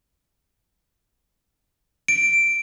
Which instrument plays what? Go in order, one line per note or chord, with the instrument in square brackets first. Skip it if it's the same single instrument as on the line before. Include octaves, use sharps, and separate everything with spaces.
[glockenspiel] D7